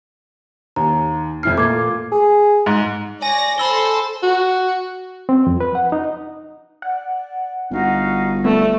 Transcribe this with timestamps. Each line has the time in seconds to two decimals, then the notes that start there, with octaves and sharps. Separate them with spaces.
0.76 D#2 A#5
1.43 F2 E4 F6 C7
1.57 A#2 A3 D6 G#6
2.12 G#4
2.66 G#2
3.22 C#5 D5 G#5 A#6
3.58 A4 C5 B5 C6 E6 G7
4.23 F#4
5.29 C4
5.47 F2
5.60 B4
5.75 F#5
5.92 D#4
6.82 D5 F#5
7.71 G1 D#4 F#4 F5
8.45 A3 B3 D5